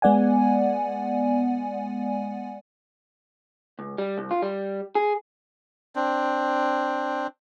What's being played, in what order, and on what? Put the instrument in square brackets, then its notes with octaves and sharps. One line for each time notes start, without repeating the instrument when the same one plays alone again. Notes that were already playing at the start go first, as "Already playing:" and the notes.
[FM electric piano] G#3 B3 D5 F#5 G#5
[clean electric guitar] C#2
G3
C2
F4
G3
G#4
[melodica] C4 D4